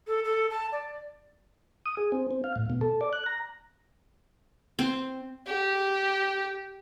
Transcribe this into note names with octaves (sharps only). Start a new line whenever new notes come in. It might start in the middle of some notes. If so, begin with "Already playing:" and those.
A4
A4
A5
D5
D#6
G#4
C4
C4
F5
A2
B2
A4
D5
F#6
A#5
C4
G4